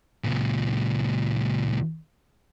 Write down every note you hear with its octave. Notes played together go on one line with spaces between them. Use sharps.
C#2 A#2